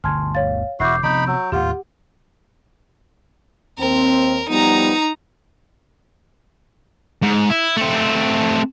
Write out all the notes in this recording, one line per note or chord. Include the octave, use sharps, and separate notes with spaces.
G1 D2 B2 G#5 A5 C6 F6 G#6
C#5 F5 A6
E1 E4 F#4 D6 G6 C7
C3 F3 B3 D#4 B5 C#6 G6 D7
F#3 E6
D#2 A2 F4 G4 F#5
D#2 C4 A#4
F3 G3 B3 D#4 A#5
G#2
E4
A3 C4